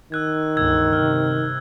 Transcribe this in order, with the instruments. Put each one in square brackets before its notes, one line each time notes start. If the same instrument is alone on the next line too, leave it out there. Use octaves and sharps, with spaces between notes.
[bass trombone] D#3 [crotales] E6 F#6 G#6
[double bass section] G1 C#2 [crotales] E6 G#6
[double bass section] C3 [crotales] F6